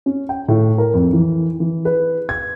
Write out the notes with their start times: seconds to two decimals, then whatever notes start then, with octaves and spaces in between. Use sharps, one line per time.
0.06 C#4
0.29 G5
0.48 A2
0.78 A#4
0.94 F2
1.13 E3
1.60 E3
1.85 B4
2.29 G#6